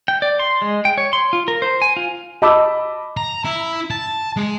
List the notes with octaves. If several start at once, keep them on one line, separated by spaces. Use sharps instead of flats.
G5
D5
C6
G#3
G5
C#5
C6
F4
A#4
C5
G#5
F4
D#5 A5 B5 D6 E6
A#5
E4
A5
G#3